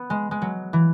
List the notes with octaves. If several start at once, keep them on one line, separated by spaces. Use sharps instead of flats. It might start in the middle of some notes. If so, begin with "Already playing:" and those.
Already playing: B3
G#3
G#3
F#3
E3